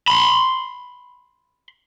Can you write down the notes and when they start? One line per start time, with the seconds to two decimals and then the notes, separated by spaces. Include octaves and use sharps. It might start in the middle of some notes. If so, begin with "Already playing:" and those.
0.08 B5 C6